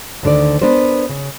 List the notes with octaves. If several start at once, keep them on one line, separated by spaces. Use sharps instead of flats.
D2 B2 D3 D#3 D5
B3 D4 A#4 C5
C#3